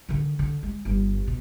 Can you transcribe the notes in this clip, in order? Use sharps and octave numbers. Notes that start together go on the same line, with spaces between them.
D3 D#3
D3
G#3
G1 G2
B2